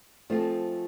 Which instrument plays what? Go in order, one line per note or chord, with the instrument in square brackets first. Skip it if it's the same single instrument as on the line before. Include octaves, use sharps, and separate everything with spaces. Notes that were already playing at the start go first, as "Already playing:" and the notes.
[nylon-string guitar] F3 A3 C4 F4 G#4